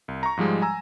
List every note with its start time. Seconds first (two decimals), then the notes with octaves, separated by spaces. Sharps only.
0.08 C2
0.23 A#5 C#6
0.37 G#2 F3 G3 G#3
0.62 G#5 A#5 E6